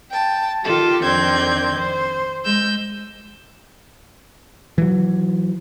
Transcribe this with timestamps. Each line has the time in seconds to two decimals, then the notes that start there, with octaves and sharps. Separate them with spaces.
0.10 G5 A5
0.63 D#3 F4 G4 A4
1.03 F2 D#3 C4 D4 G6 G#6
1.75 C5
2.45 G#3 E6 G6
4.78 E3 F#3